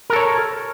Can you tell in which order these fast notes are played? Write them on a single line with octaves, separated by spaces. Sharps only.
A#4 A4 C#5